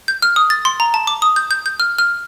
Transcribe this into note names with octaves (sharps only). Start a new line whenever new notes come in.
G6
F6
D#6
A6
C6
A#5
A5
D6
D#6
G6
G6
G6
F6
F6